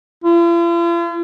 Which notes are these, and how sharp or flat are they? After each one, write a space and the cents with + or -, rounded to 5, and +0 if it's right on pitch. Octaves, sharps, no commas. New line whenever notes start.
F4 -45